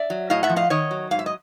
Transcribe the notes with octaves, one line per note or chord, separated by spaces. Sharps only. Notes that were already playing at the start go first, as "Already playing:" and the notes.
Already playing: D5 E5
F#3
A2 D#5 F5
E5 F#5
F3
D#5 F5
D#3 C#5 D#5
F#3
G#2 F5
E5
D#5